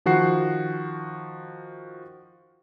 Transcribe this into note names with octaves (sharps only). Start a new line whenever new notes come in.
D#3 F3 F#4 F#5 C7